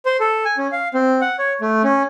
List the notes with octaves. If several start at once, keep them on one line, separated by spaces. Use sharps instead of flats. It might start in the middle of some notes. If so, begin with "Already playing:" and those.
C5
A4
G#5
C#4
F5
C4
F#5
C#5
A3
C#4